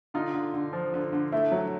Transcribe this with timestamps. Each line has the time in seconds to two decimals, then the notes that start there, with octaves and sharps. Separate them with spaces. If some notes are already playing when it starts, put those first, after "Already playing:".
0.14 D3 D#4 F4
0.34 D3
0.54 D3
0.73 F3
0.94 D3
1.13 D3
1.32 A3 E4
1.52 F#3